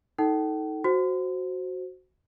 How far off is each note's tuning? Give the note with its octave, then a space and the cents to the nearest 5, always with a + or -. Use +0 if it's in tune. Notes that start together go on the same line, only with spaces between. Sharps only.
D#4 +20 A4 +0 G5 -45
F#4 +0 C5 +0